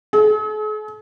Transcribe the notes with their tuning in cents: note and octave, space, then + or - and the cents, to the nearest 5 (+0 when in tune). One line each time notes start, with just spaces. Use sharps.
G#4 +45